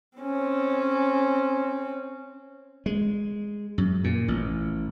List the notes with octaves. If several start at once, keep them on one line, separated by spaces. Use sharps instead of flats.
C4 C#4
G#3
F#2
A#2
A1